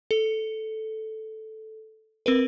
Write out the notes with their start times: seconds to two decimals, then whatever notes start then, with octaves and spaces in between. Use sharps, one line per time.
0.11 A4
2.26 C4 A#4 B4